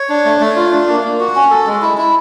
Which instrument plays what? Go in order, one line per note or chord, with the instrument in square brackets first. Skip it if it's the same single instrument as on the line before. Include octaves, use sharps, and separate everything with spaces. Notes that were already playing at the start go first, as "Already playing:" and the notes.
Already playing: [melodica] C#5
D4
A3
A3
F4
D4
A#3
A#3
F#4
C#4
A4
G#3
E4
E4